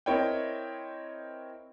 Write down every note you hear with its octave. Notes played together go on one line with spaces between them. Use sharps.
C4 E4 A#4 C#5 D#5 G5